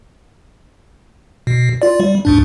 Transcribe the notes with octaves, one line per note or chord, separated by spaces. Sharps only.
B2
F4 D5
G3
D2 G#2 D4